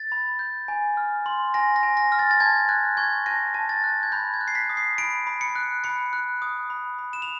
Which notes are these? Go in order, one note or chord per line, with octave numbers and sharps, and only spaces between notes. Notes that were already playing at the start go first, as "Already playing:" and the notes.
Already playing: A6
B5
G6
G#5
F6
C6
G#5 A#6
A#6
G#5
A#6
F6
A6
A6
A5 G#6
F#6 G#6
C#6 G#6
A5 A#6
A5
A6
F#6
G#6
B5 G6
G#6
F#6
C7
B6
D#6
C7
B5 D7
B5
C#7
F#6
B5 C#7
F#6
D#6
B5
B5
E7
F7